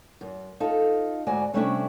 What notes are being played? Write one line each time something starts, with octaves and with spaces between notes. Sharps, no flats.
F#2
D#4 F4 A4
D2 G#2 F#4 D5 G#5
C3 G3 A3 C#4 D4 E4